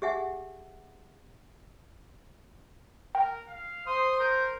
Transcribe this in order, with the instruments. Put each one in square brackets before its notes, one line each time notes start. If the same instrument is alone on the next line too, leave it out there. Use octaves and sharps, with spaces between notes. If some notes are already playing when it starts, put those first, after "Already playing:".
[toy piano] G4 G#4 E5 F#5 G#5
[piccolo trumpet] A#4 [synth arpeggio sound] G5
[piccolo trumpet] F5
[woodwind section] C5 [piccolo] C6 [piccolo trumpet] D#6
[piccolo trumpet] A#4 [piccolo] G6